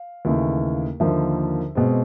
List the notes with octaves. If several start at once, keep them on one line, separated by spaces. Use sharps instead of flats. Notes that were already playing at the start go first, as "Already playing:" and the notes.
Already playing: F5
D#2 C#3 E3 A3
D#2 D3 F3 A#3 E5
B2 G#3 C4